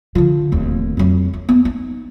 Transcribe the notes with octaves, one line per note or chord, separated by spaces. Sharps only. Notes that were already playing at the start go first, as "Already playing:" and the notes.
D3 F3
D1 D#2
F2 F#3
D#4
B3
D#4